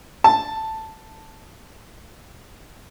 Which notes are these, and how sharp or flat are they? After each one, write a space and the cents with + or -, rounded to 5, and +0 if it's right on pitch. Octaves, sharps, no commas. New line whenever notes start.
A5 +5